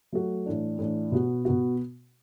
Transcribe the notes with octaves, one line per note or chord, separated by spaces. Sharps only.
F#3 A3 F#4
A2 E3 D4
A2 E3 D4
B2 B3 F#4
B2 B3 F#4